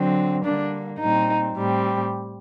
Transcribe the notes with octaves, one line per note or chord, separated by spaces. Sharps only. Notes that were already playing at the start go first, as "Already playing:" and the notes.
Already playing: D3 F#3 C4
D3 G3 A#3 D4
A#2 G3 C4 D#4
A2 G3 C4